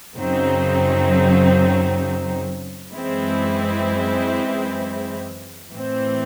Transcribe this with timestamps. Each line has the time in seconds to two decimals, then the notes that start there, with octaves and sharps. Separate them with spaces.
0.16 F#2 C#3 F#3 C4 D#4
2.93 F#2 E3 G#3 C4 E4
5.70 A2 E3 C4